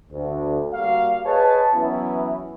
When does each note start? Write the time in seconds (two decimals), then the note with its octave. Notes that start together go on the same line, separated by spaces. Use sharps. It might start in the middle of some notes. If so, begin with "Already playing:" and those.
0.11 D2
0.73 G3 A#3 F#4 F5
1.26 G#4 B4 C#5 D#5 A5
1.74 E3 F#3 B3 C#4 E4